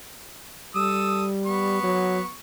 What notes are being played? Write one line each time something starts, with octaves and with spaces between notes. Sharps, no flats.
G3 A4 D#6 E6
B3 C#6
F#3